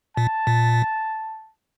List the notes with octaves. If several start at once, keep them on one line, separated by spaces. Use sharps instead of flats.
A#2 A5
A#2